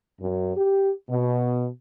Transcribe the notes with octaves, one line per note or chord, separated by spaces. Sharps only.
F#2
G4
B2